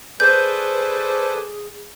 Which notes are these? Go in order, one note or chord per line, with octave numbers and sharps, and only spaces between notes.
G#4 A4 B4 C5 D5 G#5 G6